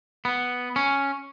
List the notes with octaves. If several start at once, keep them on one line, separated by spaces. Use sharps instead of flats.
B3
C#4